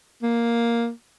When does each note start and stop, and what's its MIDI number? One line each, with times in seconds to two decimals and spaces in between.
0.23 0.90 58